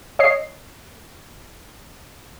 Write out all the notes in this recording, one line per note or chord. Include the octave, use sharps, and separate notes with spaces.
C#5 D#5 C7